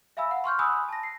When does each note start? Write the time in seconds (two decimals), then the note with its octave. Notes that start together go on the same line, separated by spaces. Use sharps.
0.17 E5 F5 G#5 B5 E6
0.31 F#5
0.44 C6 C#6 F6 G6
0.59 G#5 B5 D#6 E6 F#6
0.89 A5 A#6
1.03 C7